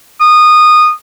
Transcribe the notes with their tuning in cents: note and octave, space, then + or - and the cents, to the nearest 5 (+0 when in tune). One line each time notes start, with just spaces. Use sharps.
D#6 -20